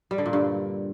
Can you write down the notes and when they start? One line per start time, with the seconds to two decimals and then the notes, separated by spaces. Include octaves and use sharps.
0.11 G3
0.18 D3
0.26 A#2
0.33 G2